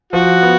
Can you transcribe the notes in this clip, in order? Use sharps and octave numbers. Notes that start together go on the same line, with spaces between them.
F3 F#4
B3